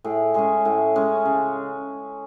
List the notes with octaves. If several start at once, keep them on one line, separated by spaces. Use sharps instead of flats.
A2 G#4
G#3 C#4 G#4
A2
G#3 C#4
C#3